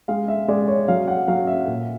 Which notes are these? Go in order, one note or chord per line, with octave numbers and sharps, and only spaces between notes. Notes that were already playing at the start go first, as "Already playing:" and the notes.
G#3 F5
E5
G#3 D5
C#5
F#3 F5
F#5
F#3 F5
E5
A#2